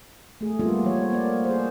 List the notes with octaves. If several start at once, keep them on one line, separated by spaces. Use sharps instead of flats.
A3 G#4
G3 A#3 B3 D4 F4 A4
F3 C#5
A#3 D5
G#4 C5